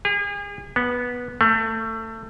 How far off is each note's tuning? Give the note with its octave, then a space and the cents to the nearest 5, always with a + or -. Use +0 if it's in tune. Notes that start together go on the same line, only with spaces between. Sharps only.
G#4 -40
B3 -10
A3 +25